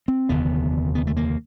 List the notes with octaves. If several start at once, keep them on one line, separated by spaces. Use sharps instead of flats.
C4
F1 D#2 D3 B3
B3
A3
A#3